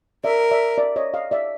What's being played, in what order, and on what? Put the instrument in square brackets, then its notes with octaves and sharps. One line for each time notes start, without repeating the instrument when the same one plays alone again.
[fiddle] A#4 [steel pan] D5 E5
[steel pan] D5 E5
D5 E5
C#5 D#5
D#5 F5
D5 E5